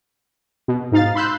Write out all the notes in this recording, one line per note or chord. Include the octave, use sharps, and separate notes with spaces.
B2
G#2 D#4 F5 A6
B5 C6 E6 F#6 G6